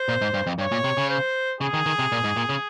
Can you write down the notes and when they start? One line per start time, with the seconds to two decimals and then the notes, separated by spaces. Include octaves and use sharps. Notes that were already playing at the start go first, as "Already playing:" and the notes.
Already playing: C5
0.09 A#2
0.21 G#2
0.34 G2
0.47 F2
0.59 G2 C#5
0.72 A#2
0.84 C3
0.97 C#3
1.10 C5
1.61 C#3 G#4
1.74 D#3
1.86 D#3
1.99 C3
2.12 A#2
2.24 G#2
2.37 A#2
2.49 C#3